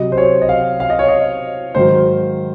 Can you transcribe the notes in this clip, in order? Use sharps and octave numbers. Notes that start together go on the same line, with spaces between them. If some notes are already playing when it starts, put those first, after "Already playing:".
Already playing: C3 F#3 D#5
C5
C#5
D#5
F5
F5
D#5
C#5
D#5
G#2 D#3 F#3 C5